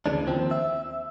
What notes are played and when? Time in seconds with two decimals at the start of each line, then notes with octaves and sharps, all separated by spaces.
0.06 D2 C#3 E3 D4
0.27 D#2 F3 C4
0.51 E5